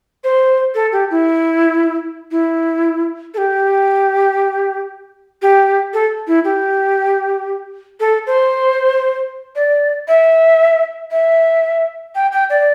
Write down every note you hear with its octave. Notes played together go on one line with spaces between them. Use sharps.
C5
A4
G4
E4
E4
A4
G4
G4
A4
E4
G4
A4
C5
D5
E5
E5
G5
G5
D5